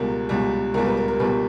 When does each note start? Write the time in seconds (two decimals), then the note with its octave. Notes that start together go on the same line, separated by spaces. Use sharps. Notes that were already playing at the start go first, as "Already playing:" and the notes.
Already playing: C#2 B2 G3 A#4
0.29 C#2 B2 G3
0.74 C#2 B2 G3 A#4
0.86 B4
0.97 A#4
1.08 A#4
1.20 C#2 B2 G3 B4